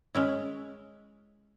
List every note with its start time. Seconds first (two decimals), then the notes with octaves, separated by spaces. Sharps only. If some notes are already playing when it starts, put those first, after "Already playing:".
0.15 G#3 C#4 E4